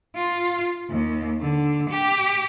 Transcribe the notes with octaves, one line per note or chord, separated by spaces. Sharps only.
F4
D#2
D3
G4